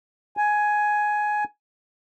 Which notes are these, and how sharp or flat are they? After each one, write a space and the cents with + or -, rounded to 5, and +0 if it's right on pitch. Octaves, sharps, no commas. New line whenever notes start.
G#5 +10